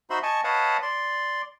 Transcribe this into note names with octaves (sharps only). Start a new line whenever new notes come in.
D#4 F#4 C5 E5 B5 C6
D#5 G#5 A5 C#6 D#6
B4 C#5 D#5 F5 F#5 A5
D5 C6